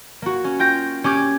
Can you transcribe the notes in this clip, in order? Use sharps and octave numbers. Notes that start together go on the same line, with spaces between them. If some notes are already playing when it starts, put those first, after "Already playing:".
A#3 F#4
C#4
F4 G5 G6 A#6
C#4 G4 D6 G#6